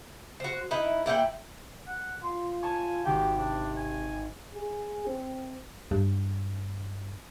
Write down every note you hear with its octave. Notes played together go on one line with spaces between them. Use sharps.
F#4 C5
D#4 E4 B4
A#2 E4 F#5 G5
F#5
F4 C6
C#5 G#5 A5 C#6
G#1 F#4 G4 G5
C3 D4
G#5
G#4
C4
G2